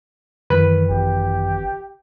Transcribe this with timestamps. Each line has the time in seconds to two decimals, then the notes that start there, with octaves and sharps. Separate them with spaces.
0.50 F#2 D#3 E3 B4
0.90 G#1 G4